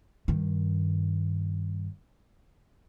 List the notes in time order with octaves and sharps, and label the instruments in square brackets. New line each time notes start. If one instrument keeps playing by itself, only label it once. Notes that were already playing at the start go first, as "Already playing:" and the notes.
[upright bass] G2 D#3